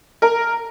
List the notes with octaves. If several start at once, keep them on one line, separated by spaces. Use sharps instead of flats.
A#4